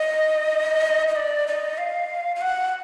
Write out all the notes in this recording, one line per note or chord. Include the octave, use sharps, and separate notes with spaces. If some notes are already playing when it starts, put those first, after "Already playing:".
Already playing: D#5
D#5
D5
D#5
F5
F5
F#5